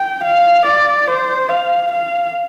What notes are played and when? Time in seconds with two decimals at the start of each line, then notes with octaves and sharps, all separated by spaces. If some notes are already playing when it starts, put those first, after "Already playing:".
Already playing: G5
0.24 F5
0.66 D5
1.07 C5
1.49 F5
1.92 F5